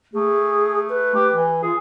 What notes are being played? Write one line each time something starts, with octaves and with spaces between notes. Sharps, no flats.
A3 G#4
B4
G4
E3
F4 G#4